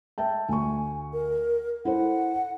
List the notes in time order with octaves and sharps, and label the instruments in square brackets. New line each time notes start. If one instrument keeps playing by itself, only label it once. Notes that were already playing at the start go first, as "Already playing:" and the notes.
[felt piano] E5 G5 A5
[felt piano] D2 C#6 [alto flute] G#5
[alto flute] A#4
[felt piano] E4 A4 C5 [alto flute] F#5